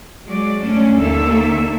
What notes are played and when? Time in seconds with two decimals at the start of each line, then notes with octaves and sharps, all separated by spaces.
0.25 F#3 G#3 D5
0.60 G2 A3 C#4 D4
0.96 D#2 D3 A#3 A4 E5